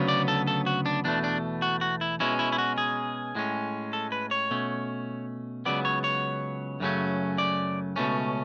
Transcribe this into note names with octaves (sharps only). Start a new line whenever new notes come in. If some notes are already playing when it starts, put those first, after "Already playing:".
Already playing: D2 C#3 F#3 B3
D5
A4
A4
F#4
D4
E2 B2 A3 D4
D4
F#4
F#4
E4
B2 G#3 C#4 E4
E4
E4
F#4
G#4
A2 G#3 C#4
A4
B4
C#5
B2 A3 C#4
C#2 C#3 F#3 B3 D5
C#5
C#5
F#2 C#3 F#3 A3 C#4
D5
C#2 B2 A3 C#4